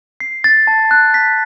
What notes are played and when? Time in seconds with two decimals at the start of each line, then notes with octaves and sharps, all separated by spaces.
0.20 C7
0.44 A6
0.67 A5
0.91 F#6
1.14 B6